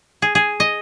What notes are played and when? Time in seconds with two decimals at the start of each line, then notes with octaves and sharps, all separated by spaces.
0.22 G#4
0.35 G#4
0.60 D#5